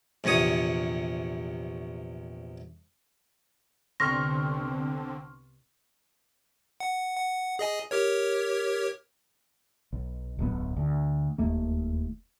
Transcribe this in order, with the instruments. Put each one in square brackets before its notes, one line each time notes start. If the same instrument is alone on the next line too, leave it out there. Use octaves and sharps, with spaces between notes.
[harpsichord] A#1 E2 C3 C#5 D#6
[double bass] C2 B3 [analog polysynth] D3 C4 [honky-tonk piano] C6 C#6 F6 [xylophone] A#6
[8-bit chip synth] F#5
F#5
G#4 D#5 G#5
G4 A#4 C#5
[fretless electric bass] B1
D1 B1 A#2 B3
D2
E1 D#2 A3 A#3